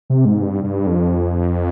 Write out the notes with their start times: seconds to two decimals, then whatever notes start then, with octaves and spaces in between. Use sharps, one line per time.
0.10 C3
0.25 G#2
0.41 G2
0.64 G2
0.87 F2